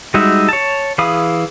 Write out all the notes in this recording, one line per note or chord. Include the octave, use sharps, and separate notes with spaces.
G3 G#3 D#4 F#4 E5
C#5 A5
E3 G#4 F5 B5 D#6